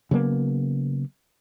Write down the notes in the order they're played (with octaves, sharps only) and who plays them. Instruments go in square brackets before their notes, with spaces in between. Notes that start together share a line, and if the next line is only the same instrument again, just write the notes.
[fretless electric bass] C#3 F#3 A#3 B3